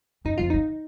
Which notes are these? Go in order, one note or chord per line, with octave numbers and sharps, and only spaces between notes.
F#2 D#4
F2 F4
D#3 D#4